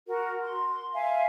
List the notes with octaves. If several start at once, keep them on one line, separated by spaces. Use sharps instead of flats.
F#4 A#4
C6
E5 F5 G#5